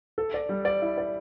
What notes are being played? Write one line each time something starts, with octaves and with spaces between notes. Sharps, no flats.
A4
D5
G3
D5
E4
D5